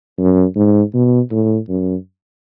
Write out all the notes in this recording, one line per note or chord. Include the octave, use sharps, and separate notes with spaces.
F#2
G#2
B2
A2
F#2